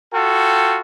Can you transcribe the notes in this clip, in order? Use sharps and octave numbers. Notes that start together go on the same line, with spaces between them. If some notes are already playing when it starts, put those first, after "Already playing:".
F4 F#4 A4 G5